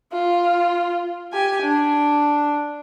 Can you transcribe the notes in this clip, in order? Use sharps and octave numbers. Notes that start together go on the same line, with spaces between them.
F4
G4 G#5
D4